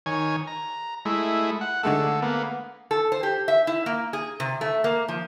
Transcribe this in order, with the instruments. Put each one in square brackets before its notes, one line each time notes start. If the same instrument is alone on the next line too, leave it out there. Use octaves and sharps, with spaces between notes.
[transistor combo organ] D#3 C#5 G#5
A#5
G#3 A3 E4
F#5
[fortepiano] D3 G#3 A3 [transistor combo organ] A4
[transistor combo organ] A#3 B3
[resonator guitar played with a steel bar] A4
C5
G4
E5
E4
A#3
G#4
C3
A3
A#3
F3